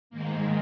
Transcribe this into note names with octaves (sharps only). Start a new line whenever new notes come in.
G#2 D#3 G#3 A#3